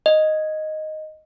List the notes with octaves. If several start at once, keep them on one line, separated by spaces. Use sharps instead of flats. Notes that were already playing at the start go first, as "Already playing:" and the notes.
D#5